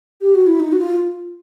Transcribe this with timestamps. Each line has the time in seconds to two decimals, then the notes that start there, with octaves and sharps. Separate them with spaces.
0.22 G4
0.35 F#4
0.47 E4
0.60 D#4
0.72 F#4
0.79 F4